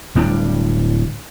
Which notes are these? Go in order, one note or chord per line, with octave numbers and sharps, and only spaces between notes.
D1 G3 D4